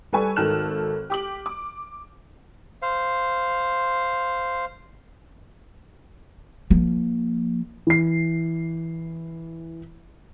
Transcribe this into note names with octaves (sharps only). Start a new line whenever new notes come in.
G3 A4 B4 G#5 C#6
G#1 D#3 A4 F6 F#6 E7
G4 D6 F#7
D6
C5 F5
F3 A#3
E3 C7